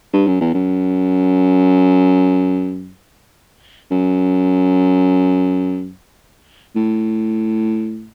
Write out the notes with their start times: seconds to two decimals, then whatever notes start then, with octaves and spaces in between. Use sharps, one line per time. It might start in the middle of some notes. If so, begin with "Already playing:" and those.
0.13 G2
0.27 F#2
0.41 E2
0.54 F#2
3.91 F#2
6.76 A2